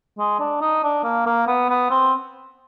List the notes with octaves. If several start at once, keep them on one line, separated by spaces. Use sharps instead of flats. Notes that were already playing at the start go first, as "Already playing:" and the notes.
G#3
D4
D#4
D4
A#3
A#3
B3
B3
C4